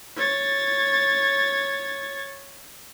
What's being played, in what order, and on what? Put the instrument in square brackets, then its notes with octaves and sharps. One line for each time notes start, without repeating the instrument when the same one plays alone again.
[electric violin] C#5 A6